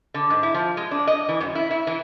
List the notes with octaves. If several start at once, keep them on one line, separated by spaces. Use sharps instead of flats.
D3
G#2
E4
F3
G#3
D4
D#5
E3
F#2
E4
E4
E3